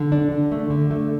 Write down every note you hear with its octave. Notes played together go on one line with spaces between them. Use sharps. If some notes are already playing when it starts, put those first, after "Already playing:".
Already playing: D3
D4
D3
A3
D3
A3